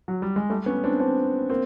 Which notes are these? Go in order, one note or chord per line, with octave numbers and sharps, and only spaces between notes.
F#3
G3
G#3
G3 A3
B3 C#4
C4 D4
C4 D4
A#3 C4